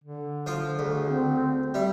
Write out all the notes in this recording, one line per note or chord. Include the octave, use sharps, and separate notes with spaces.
D3
F3 F4
D2 G#4
C4
G3 E5